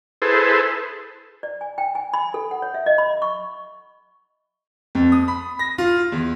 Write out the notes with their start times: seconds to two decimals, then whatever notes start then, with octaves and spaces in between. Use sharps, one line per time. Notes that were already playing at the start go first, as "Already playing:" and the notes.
0.22 E4 G#4 A4 B4 C5
1.43 D5
1.61 G#5
1.78 G5
1.95 G#5
2.13 B5
2.34 A4
2.51 F#5
2.62 C#5
2.74 E5
2.86 D#5
2.98 B5
3.22 C#6
4.95 F2
5.12 D#6
5.28 B5
5.59 A#6
5.78 F4
6.12 E2